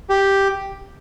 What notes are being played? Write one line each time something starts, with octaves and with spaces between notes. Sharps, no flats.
G4